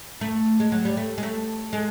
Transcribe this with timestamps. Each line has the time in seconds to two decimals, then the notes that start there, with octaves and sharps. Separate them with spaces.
0.21 A3
0.60 G#3
0.72 F#3
0.85 G3
0.97 A3
1.18 G#3
1.23 A3
1.73 G#3